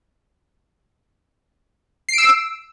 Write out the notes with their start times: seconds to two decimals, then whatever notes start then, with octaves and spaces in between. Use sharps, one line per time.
2.09 C7
2.13 D7
2.18 E6